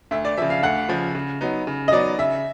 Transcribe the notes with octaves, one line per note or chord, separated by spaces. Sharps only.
D2 E5
D5
C#3 F3 E5
F5
D2 F#5
C#3 F3
C#3
F#3 B3 D#4
C#3
D#5
F#3 B3 D#4 D5
C#3 E5